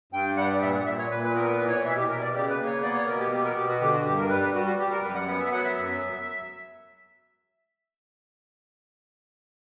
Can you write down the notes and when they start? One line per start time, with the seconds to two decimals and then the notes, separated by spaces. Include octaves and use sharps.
0.12 G2 G5
0.37 G3 F#5
0.50 D5
0.62 A#2 E5
0.74 F#5
0.86 A#2 E5
0.99 C#5
1.11 A#2 B4
1.24 B4
1.35 B3 A#4
1.52 B4
1.60 E3
1.68 C#5
1.85 B2 E5
1.97 G4
2.09 B2 A#4
2.21 D5
2.33 C#3 G4
2.49 B4
2.58 A#3
2.66 C#5
2.82 B3 D5
2.95 C#5
3.07 B2 A#4
3.19 G4
3.31 B3 G4
3.44 A#4
3.56 B2 G4
3.68 F#4
3.80 D3 G4
3.93 F#4
4.05 G2 G4
4.17 A#4
4.29 G3 B4
4.42 B4
4.54 G3 F#4
4.66 F#4
4.78 G3 G4
4.91 A#4
5.03 F#2 B4
5.15 F#5
5.27 B3 F#5
5.40 E5
5.52 F#3 F#5
5.64 E5
5.77 F#2